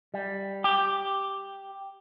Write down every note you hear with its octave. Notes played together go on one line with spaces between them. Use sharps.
G3
G4